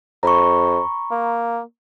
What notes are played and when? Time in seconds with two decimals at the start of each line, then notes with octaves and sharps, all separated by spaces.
0.23 F2 A#5 B5 C#6
1.11 A#3